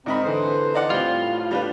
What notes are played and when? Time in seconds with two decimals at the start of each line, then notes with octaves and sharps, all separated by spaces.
0.06 G#2 C4 A#4 D#5 B5
0.24 D3 E3 C5
0.74 D#4 D5 F#5
0.90 A2 G3 C4 F4
1.51 G3 D4 B4